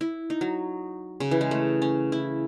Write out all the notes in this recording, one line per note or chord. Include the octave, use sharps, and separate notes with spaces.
E4
D#4
F#3
C#3
E3
G#3
A3
C#4
E4